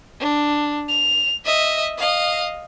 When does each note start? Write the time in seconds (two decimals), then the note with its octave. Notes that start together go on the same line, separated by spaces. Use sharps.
0.20 D4
0.89 F7
1.45 D#5 E5
1.97 D#5 F5